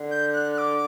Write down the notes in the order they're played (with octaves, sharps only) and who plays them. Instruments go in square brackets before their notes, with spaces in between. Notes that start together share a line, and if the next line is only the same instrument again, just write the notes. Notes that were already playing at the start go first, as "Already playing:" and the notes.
Already playing: [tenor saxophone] D3
[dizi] G6
F#6
F#6
D6